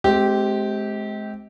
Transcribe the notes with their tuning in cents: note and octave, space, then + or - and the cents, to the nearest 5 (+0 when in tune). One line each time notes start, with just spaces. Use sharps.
G#3 +35 C4 +0 G4 -15